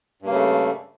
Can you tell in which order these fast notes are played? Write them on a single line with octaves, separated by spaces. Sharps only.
G2 A#3 C#3 A3